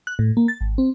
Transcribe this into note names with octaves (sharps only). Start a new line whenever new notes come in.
F#6
A2
A#3
A6
G#1
C4